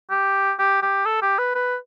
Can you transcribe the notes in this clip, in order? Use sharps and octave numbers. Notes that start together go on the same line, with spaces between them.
G4
G4
G4
A4
G4
B4
B4